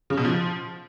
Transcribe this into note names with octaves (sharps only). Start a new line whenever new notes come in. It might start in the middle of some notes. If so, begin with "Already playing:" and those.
C#3
B2
F3